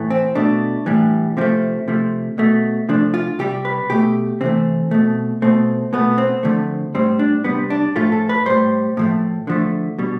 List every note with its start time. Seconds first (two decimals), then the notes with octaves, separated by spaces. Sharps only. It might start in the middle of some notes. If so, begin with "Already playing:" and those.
Already playing: A2 E3 A3
0.11 C4
0.35 B2 A3 D4
0.86 A2 E3 G3
1.37 C3 F3 A3 C4
1.88 C3 F3 A3
2.38 B2 A3
2.89 C3 F3 A3 D4
3.14 F4
3.39 C3 G3 G4
3.65 B4
3.90 B2 A3 G4
4.41 C3 E3 A3 C4
4.91 B2 A3
5.42 B2 A3 C4
5.93 B2 A3 B3
6.18 C4
6.43 D3 F3 A3
6.95 A2 G3 C4
7.19 D4
7.44 C3 G3 B3
7.70 D4
7.96 A2 F3 A3 F4
8.12 A4
8.29 B4
8.46 A2 G3 C5
8.97 A2 F3 A3
9.47 D3 F3 A3
9.99 B2 G3